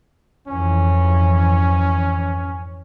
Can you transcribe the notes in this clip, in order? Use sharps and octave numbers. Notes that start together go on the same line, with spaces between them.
F2 G#2 E3 C#4